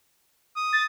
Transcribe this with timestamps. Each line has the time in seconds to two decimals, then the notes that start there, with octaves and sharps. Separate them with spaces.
0.56 D#6
0.73 A6